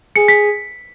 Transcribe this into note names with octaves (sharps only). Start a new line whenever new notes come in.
G#4 C#7
B6